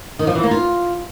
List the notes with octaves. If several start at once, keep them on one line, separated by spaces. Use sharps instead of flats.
D#3
F3
E3
A#3
F4